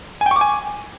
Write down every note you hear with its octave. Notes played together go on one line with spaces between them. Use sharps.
G#5
G5
C#6
D6
G#5